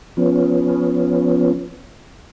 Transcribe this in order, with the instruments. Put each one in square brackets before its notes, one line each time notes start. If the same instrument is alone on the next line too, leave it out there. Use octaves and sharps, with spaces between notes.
[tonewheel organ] F3 B3 C#4